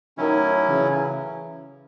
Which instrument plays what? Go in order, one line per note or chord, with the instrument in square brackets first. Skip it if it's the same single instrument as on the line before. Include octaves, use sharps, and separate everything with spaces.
[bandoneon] A2 F#3 C#4 E4 [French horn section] D#3
[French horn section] C#3 E3